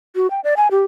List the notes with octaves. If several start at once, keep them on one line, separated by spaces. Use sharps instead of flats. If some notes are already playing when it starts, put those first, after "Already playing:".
F#4
G5
D5
G#5
G4